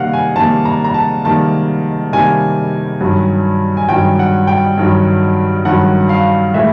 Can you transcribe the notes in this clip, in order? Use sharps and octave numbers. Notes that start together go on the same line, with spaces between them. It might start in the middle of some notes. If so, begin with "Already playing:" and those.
Already playing: C3 D#3 G3 A#3 F5 F#5
G#5
C3 D#3 G3 A#3 A5
A#5
A#5
A5
C3 D#3 G3 A#3 A5
C3 D#3 G3 A#3 G#5
G2 D#3 F#3
G#5
G2 D#3 F#3 G5
F#5
G5
G2 D#3 F#3
G2 D#3 F#3 F#5
F5
A2 E3 G#3 E5